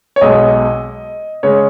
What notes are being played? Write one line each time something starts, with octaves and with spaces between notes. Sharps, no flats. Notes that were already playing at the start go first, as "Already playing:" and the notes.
C#5
B1 B2 G#3 D#5
C#3 G#3 C#5